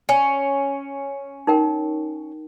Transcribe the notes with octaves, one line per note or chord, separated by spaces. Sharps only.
C#4
D#4 A#4 G5